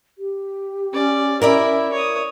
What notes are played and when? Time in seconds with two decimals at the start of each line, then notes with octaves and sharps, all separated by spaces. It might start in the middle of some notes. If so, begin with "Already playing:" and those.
0.18 G4
0.93 C#4 D5
1.42 E4 A#4 D5 E5
1.92 C#5 D#6